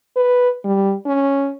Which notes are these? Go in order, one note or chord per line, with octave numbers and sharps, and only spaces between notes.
B4
G3
C#4